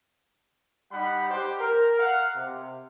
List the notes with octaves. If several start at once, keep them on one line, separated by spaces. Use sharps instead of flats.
G3 D#4 F#5 B5
G4 C5
A#4
F5 F#5
C3